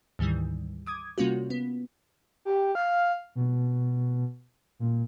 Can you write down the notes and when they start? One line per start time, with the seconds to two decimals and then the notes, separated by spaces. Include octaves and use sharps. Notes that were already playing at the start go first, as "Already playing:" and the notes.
0.19 D2 G#2 D#3 E3 G3
0.86 D6 D#6 G#6
1.18 C3 G3 A#3 C#4 F4 F#4
1.50 B3
2.45 G4
2.75 F5
3.35 B2
4.80 A#2